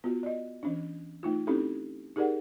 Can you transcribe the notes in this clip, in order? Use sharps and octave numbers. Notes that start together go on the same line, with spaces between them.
B3 F4 F#4
D5 D#5
E3 C#4 D4
A3 D#4 F4
C4 C#4 D#4 E4 G4 A4
D#4 G4 G#4 A#4 D5 F#5